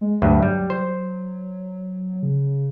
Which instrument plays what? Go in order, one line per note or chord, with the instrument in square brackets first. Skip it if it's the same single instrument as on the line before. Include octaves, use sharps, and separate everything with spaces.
[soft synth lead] G#3
[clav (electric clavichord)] D2 G2 [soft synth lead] F#3
[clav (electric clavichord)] G3
C5
[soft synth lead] C#3
C#3